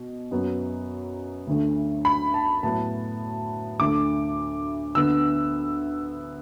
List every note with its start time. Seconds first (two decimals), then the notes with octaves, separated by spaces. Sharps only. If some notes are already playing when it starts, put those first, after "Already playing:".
Already playing: B2
0.31 F#2 F#3 B3
1.47 D2 D3 A3
2.05 B5
2.34 A5
2.63 A2 F#3 B3 A5
3.79 D2 D3 A3 D6
4.95 D2 D3 B3 E6